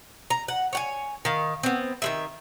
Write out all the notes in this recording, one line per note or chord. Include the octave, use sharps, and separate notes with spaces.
A#5
F#5
C#5 F#5 G#5
D#3 F5
B3 C4
D#3 G#3 E5